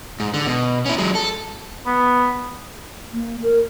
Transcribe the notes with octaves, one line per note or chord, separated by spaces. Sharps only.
G#2
D3
B2
C#4 E4
F#3 G#3
A4
B3
A#3
A#4